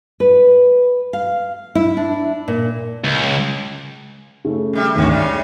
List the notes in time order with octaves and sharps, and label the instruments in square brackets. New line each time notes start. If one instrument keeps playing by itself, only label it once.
[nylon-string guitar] B4
F5
E4
D4
A#2
[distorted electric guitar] C#2
[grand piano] C#3 A3
[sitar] F#2 G3 E5
[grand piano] G#1 D2 [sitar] D#3 C#4 F#4
[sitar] C#3 G3 G#3 [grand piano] D5